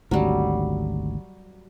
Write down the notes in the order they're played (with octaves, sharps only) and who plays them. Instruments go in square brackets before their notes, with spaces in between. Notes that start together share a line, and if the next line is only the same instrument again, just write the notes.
[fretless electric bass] G#1 D2 [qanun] F#3 G3